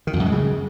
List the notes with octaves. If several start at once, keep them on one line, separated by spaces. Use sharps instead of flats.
D#3
F2
F#2
G#3
C#3